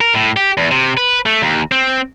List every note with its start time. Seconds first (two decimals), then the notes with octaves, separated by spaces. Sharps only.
0.01 A#4
0.15 A2
0.37 G4
0.57 E2
0.71 C3
0.97 B4
1.26 A3
1.42 D#2
1.72 C4